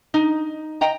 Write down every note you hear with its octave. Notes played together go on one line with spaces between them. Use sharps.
D#4
D#5 G5 A#5